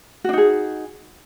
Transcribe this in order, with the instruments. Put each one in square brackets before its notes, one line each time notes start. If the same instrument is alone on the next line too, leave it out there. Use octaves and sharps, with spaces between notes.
[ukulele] F#4
D4
D#4
G#4